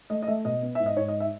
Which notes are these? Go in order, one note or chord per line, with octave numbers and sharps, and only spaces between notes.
A3 D#5
D#5
A3 E5
B2 D#5
B3
G#2 E5
D#5
G#2 C#5
D#5
E5